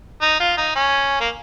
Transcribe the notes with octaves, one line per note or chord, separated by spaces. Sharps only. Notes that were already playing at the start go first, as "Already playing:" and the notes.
D#4
F4
D#4
C#4
A#3